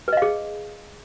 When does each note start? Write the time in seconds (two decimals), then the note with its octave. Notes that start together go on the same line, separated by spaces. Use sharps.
0.08 B4
0.13 D#5
0.17 F5
0.22 G#4